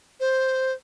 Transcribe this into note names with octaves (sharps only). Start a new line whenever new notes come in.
C5